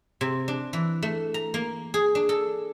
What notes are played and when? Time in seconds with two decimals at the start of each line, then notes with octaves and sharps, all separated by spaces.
0.21 C3
0.48 D4
0.73 E3
1.03 A3
1.34 A#5
1.54 A#3
1.94 G#4
2.15 D4
2.29 A4